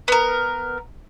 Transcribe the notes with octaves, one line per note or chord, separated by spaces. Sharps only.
B3 A#4